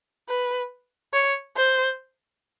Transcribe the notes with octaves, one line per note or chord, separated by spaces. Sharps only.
B4
C#5
C5